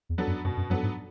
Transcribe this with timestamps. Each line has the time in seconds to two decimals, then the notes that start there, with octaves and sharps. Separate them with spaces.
0.09 E2
0.18 F#3 B3 D4 A4
0.27 F#2
0.44 F#2 B2
0.57 F#2
0.70 F#2 F#3 B3 D4 A4
0.83 G#2